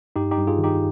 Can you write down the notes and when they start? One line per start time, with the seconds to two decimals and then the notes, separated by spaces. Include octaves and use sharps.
0.16 G2 D#4 G4
0.31 D#4 G4
0.38 G2
0.47 F4 G#4
0.58 D#3
0.64 D#4 G4